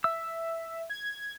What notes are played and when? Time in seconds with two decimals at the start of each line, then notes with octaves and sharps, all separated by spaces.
0.04 E5 E6
0.90 G#6